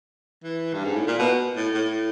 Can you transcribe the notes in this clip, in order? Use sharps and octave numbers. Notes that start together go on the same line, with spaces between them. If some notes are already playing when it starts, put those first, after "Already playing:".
E3
G2
G#2
A2
A#2
B2
A2
A2